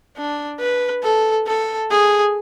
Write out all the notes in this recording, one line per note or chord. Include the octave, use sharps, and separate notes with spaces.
D4
B4
A4
A4
G#4